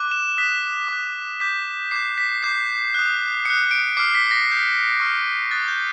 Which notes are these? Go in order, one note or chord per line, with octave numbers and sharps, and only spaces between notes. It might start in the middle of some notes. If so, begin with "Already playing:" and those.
Already playing: D6 F#6
E7
D#6 F#6 B6
D6 F#6
D6 G6 B6
D6 G6 C7
B6
D6 G6 C7
D#6 F#6
D#6 F#6 C#7
D7
D6 F6 C7
B6
B6
A#6
D#6 G6
C#6 F6
D#6 F#6 A6
G6